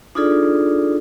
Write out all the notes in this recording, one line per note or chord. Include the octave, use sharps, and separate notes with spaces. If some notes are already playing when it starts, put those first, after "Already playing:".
D4 D#4 F4 G#4 A4 D5